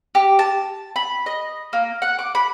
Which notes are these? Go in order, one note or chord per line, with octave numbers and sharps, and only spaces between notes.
G4
A5
B5
D#5
A#3
F#5
D6
B5